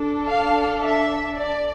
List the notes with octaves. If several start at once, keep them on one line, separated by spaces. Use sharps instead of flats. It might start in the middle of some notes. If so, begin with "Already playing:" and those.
Already playing: D4 A4
F5
E5
D5